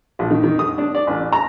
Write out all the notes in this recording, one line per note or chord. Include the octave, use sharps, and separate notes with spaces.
A#1
D#3
D#3
D#6
D4
D5
A1
A#5